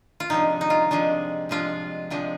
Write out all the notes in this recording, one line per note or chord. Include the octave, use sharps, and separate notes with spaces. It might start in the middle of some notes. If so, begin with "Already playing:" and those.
F4
C3 F3 G#3 D4 D#4
D#4
F4
C3 F3 G#3 D4
C3 F3 G#3 D4 F4
C3 F3 G#3 D4